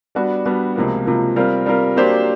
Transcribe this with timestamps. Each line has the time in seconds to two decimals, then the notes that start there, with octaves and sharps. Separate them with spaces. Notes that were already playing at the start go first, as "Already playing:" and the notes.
0.15 G3 B3 D4 F#4
0.46 G3 B3 D4 F#4
0.76 C#2 C3 F3 A#3
1.05 C#2 C3 F3 A#3
1.36 G3 C4 F4 A#4
1.66 G3 C4 F4 A#4
1.96 F#3 A#3 D4 G4 C5